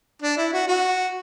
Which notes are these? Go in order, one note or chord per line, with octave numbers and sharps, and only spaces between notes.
D4
E4
F#4
F#4